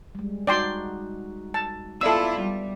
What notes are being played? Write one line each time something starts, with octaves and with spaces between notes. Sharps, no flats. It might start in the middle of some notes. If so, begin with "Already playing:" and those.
G3 G#3
D#4 F#4 D5 G5 C6
A5
B3 E4 F4 A4 D5 E5 E6
G3